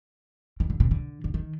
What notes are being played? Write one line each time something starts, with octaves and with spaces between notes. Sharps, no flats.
D#3
D3
C3
D3
D3
D#3